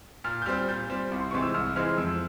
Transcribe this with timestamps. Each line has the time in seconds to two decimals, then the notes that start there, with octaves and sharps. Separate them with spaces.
0.24 A#2 F6
0.42 G6
0.46 G3 C4 F6
0.68 A#2 G6
0.90 G3 C4
1.11 C2
1.20 C6
1.31 C3 E3 G#3 C4 C#6
1.42 E6
1.54 C2 F6
1.76 C3 E3 G#3 C4 F6
1.97 F2 E6